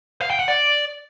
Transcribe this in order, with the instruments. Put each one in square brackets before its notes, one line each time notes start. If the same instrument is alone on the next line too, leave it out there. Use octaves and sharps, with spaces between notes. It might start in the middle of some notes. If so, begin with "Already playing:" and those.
[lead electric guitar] F5
G5
F#5
D5